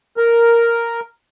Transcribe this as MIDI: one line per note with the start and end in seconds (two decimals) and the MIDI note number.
0.17 1.00 70